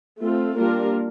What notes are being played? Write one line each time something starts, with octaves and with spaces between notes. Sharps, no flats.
A3 C4 F4 A4
G3 A#3 D4 F4 A#4